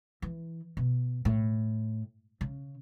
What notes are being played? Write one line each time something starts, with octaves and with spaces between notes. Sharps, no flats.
E3
B2
A2
C#3